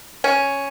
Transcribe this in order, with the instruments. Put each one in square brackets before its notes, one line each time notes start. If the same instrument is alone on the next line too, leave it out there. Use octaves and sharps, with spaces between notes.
[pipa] C#4